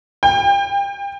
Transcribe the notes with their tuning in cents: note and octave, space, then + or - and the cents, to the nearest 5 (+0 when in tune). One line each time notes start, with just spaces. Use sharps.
G5 +35